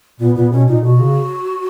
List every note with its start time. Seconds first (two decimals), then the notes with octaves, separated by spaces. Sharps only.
0.20 A#2 B3
0.36 A#2 B3
0.52 B2 C#4
0.68 A#2 D#4
0.83 B2 F#4
1.00 C#3